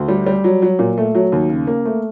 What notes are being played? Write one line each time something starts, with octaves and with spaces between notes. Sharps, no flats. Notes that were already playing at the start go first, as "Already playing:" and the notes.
Already playing: D2
G3
G3
F#3
F#3
A#2
A3
F#3
D#2
C#3
A#3
A3